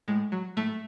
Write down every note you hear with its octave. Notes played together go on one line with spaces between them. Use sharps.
A2 G#3
F#3
A2 A3